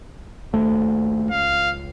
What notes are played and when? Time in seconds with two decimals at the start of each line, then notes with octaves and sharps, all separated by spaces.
0.53 D#2 A3
1.31 C#2 F5